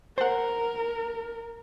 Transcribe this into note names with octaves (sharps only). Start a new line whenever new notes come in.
A#4 C5 F#5